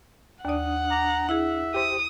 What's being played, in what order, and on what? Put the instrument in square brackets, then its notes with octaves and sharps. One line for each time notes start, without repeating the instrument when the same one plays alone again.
[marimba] D#2 D5 [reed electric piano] D4 D#6 [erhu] F#5
[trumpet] A#5 [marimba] D6
[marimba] E4 G#4 [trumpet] E5
[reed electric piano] G4 C5 [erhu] D#6